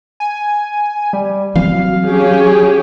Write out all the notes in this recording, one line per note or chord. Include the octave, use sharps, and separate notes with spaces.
G#5
G3
E3 F#3 G3 C4 F5
C#4 G4 G#4